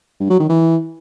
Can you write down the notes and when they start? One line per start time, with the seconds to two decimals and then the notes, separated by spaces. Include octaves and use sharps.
0.20 G2
0.30 F#3
0.40 D#3
0.49 E3